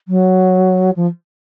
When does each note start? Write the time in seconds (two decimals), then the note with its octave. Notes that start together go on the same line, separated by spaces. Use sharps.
0.08 F#3
0.96 F3